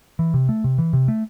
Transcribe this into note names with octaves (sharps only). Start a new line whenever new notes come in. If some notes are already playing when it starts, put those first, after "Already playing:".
E3
C3
A3
C3
E3
C3
A3